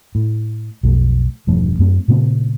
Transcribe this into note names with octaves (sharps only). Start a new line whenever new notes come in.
A2
B1 F2 A3
E1 G2 F3 A3
F#2 A3 C4
A#2 C#3 A3 C4